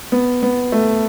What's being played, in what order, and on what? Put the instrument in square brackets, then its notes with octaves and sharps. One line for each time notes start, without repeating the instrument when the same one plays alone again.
[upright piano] B3
B3
A3